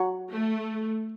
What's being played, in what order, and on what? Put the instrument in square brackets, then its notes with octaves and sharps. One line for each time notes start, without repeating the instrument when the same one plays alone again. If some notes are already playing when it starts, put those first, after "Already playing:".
Already playing: [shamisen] F#3 F#4
[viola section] A3